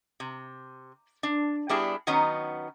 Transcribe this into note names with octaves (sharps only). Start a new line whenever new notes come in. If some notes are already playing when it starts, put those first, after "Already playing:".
C3
D4
G3 B3 D4 E4 G4 G#4
D#3 F#3 B3 C#4 D#4